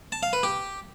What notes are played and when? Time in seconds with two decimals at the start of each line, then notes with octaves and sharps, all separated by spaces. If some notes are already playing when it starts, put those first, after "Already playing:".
0.12 A5
0.23 F5
0.33 B4
0.43 G4